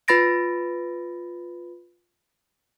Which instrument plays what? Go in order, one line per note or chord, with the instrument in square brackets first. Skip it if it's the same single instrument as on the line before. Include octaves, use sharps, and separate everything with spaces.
[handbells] F4 B4 B5 A6 A#6 D7